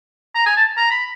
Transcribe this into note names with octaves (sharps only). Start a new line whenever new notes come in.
A#5
G#5
A5
A#5
B5